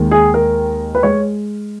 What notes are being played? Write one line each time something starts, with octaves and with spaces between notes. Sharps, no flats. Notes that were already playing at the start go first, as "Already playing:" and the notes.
Already playing: D#2 D#3 G#3
G#4
A#4
B4
G#3 C#5